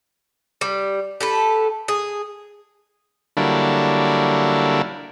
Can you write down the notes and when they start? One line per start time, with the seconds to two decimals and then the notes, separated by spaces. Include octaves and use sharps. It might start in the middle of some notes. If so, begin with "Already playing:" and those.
0.61 G3
1.21 G4 A4 B4
1.88 G#4
3.37 D3 F#3 G3 A#3 D4 E4